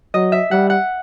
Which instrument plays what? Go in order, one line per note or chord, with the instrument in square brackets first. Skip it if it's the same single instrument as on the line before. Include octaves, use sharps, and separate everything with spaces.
[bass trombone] F#3 [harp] D#5
[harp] E5
[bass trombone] G3 [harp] F#5
[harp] F#5